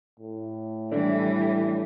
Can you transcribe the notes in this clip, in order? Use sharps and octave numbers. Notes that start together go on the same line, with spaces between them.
A2
E3 G3 D4 A4 D5